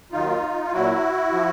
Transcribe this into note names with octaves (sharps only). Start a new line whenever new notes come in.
D#2 D#3 F#3 D#4 F4
F4
A#2 F#3 E4 F#4
F3